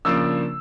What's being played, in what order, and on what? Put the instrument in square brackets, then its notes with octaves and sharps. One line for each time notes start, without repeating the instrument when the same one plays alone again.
[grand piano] C#3 F3 A#3 D4 E6